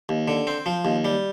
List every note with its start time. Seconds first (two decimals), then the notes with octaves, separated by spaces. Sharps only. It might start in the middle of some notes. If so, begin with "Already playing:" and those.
0.09 D#2
0.28 D3
0.47 C4
0.66 F3
0.85 D#2
1.05 G3